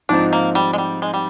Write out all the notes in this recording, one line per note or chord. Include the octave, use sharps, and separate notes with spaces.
G#2 F3 C4 D4 D#4
A#3
G3
G#3
G3
G#3
G3